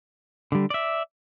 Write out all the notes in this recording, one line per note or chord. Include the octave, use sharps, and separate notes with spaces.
D3 G3
D5 E5